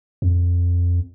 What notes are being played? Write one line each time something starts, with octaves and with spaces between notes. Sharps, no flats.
F2